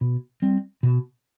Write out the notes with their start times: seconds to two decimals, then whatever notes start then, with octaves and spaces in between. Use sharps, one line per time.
0.01 B2
0.42 G3 C4
0.83 B2